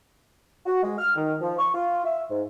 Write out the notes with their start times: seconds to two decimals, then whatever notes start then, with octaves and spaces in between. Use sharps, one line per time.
0.66 F#4
0.83 G#3
0.99 F6
1.16 D#3
1.41 F3
1.58 C#6
1.73 F4
2.05 E5
2.30 G#2